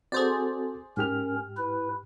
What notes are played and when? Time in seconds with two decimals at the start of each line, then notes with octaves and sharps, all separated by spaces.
0.12 C4 F#4 G#4 A4 C5 D5
0.97 G#2 C#4 G4 A#4 F6
1.57 E4 B4